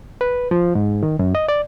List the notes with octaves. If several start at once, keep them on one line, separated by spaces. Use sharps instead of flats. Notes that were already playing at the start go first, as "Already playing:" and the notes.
B4
F3
G#2
D#3
F#2
D#5
D5